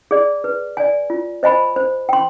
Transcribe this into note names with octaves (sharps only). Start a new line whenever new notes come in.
G#4 D5
B4
D5 G#5
F4
C5 D#5 G#5 B5
C5
G5 C6